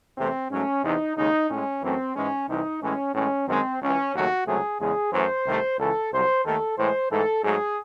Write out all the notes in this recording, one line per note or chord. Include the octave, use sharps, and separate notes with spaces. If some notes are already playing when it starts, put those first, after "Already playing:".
E2 C3 E3 A3 C4
G#2 F#3 A3 C#4
E2 C3 E3 D#4
D#2 C#3 G#3 D#4
A2 G#3 C#4
F#2 E3 A3 C4
G#2 E3 G#3 C#4
C2 C3 E3 D#4
A2 E3 G#3 C#4
A2 E3 G#3 C#4
F#2 D#3 G#3 C4
C#2 C#3 E3 C#4
D#2 C#3 F#3 A3 F#4
C#2 C3 F#3 A3 G#4
E2 C#3 G#3 G#4
F#2 E3 A3 C5
C2 C3 D#3 A3
C#2 C#3 E3 A4
C2 C3 F#3 C5
D#2 D#3 A3 A4
A2 E3 G#3 C5
G#2 E3 A3 A4
G#2 F#3 A3 G#4